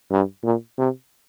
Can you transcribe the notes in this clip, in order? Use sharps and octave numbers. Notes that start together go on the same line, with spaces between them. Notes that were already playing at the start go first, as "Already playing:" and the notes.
G2
A#2
C3